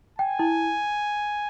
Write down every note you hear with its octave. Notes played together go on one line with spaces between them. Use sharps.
G5 G#5
E4